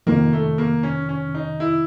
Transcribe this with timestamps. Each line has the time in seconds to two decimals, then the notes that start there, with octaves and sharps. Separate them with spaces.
0.07 F2 C3 D#3 A#3
0.33 A3
0.58 A#3
0.83 C#4
1.09 C#4
1.35 D#4
1.60 E4